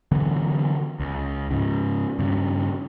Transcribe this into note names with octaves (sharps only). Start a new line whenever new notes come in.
D3 E3 F#3 B3
C#2
G#2 C#3
G2 C#3